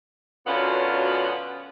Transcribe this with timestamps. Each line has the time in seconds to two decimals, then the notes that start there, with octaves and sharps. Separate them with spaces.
0.47 F#2 B2 D3 B3 C#4 F4